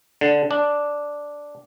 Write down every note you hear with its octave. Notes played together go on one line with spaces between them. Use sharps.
D3
D4